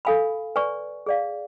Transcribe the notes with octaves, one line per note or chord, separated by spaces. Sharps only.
A4 F5 G#5 B5
B4 D5 G#5 C#6
G#4 D5 F5